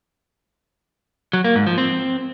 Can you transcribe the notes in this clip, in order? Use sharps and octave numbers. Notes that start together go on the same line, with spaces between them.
F#3
A#3
G#2
F3
C4